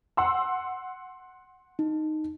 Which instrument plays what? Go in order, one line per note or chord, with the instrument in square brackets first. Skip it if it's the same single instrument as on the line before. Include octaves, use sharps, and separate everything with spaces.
[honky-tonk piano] F#5 C6 E6
[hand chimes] D#4